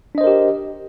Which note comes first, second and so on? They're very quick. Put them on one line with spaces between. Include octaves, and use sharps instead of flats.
D4 D#5 C5 A#4 G4